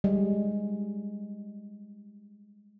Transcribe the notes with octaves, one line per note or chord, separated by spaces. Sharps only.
G3 G#3